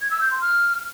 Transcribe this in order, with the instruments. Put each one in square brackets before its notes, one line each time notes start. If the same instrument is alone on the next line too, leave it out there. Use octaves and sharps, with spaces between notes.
[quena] G#6
E6
G6
C6
F6